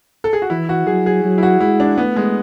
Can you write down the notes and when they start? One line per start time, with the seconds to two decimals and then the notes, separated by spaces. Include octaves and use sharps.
0.24 A4
0.33 G#4
0.42 F#4
0.50 E3 E4
0.69 F#4
0.86 F#3 G#4
1.06 G#4
1.25 F#3
1.38 E4
1.43 F#4
1.61 G#3 E4
1.80 D4
1.98 A3 B3
2.16 G#3